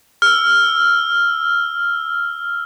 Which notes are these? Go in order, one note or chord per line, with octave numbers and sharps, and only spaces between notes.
E6 F6